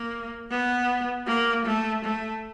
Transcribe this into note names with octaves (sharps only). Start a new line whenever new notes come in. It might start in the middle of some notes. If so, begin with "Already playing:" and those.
Already playing: A#3
B3
A#3
A3
A3